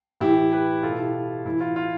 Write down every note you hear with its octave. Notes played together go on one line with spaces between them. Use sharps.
A2 E3 E4 G4
G4 B4
B2 F4 A4
E4 G4
A2 E3 E4
F4
F4